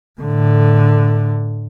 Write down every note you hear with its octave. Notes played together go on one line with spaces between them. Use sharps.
A2 D3